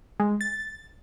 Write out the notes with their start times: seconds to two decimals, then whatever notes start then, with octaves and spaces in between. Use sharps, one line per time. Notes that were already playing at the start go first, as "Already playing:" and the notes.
0.20 G#3
0.41 A6